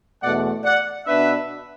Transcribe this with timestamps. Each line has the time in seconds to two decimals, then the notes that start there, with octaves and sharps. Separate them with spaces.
0.22 E2 B2 A3 D5 F#5
0.64 D5 F#5
1.07 B2 B3 D4 B4 E5